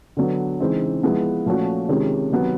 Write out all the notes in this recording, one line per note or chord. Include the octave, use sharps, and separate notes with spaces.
D3 F#3 B3
C#3 E3 G#3 C4 D#4
F3 G#3 B3 E4
A#2 F3 A3 C#4 F#4
C3 D#3 G#3 C#4 F4
C3 D#3 F#3 B3